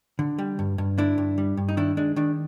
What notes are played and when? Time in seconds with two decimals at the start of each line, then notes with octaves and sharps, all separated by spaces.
0.19 D3
0.39 G3
0.59 G2
0.78 G2
0.98 D3 D4 E4
1.18 G2
1.38 G3
1.57 G2
1.69 D#4
1.77 D#3 D4 E4
1.97 G#3 D4
2.16 D#3 D4